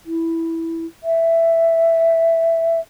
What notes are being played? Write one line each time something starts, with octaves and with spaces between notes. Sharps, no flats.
E4
E5